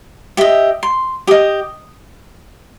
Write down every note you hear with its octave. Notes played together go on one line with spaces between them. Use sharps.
G4 D#5 E5
C6
G4 D#5 D#6